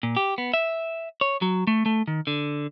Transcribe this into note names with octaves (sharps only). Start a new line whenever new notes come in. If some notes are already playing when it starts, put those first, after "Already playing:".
A#2
G4
B3
E5
C#5
F#3
A3
A3
D#3
D3